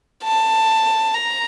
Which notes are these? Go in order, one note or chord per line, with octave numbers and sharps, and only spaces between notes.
A5
A#5